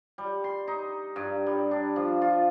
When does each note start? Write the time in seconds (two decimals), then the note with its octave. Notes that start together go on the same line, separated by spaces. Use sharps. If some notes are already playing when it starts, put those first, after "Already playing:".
0.18 G3
0.44 C6
0.67 D#4
1.16 G2
1.46 G3
1.71 D4
1.96 F3
2.22 F4